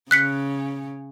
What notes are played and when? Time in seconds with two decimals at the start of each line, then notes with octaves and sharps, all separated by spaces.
0.11 C#3 F#6 B6 C#7